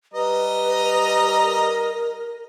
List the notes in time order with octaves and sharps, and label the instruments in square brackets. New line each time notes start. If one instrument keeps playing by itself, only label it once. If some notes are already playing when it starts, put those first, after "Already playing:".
[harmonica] G3 D#5 A#5 [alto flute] B4
[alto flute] A#4